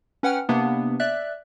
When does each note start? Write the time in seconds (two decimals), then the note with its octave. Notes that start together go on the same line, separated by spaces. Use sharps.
0.23 C#4 B4 F#5 G5 F6
0.49 C3 A#3 B3 D4
1.00 D5 E5 F#6